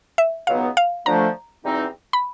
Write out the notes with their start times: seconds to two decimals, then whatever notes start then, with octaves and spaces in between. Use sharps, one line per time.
0.18 E5
0.47 C#2 B2 F#3 B3 D#4 F5
0.77 F5
1.05 D3 F3 A3 A#5
1.64 E2 B2 G3 C4 D#4
2.13 B5